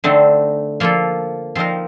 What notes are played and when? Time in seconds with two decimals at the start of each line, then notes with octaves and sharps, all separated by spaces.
0.04 D3 A3 C4 D#4
0.80 F3 A#3 F4 A4
1.55 F3 C4 D#4 A#4